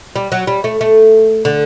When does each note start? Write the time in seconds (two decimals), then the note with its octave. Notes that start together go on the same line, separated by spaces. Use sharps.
0.16 G3
0.32 F#3
0.47 G3
0.64 A3
0.81 A3
1.45 D3